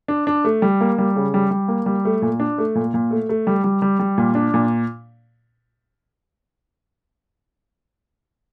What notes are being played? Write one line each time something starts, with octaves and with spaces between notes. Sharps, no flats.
D4
D4
A3
G3
A#3
G3
C#3
G3
G3
A#3
G3
A3
A#2
D4
A3
A#2
A#2
A3
A3
G3
G3
G3
G3
A#2
D4
A#2